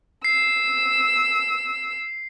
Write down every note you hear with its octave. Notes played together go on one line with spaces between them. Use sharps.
E6 C7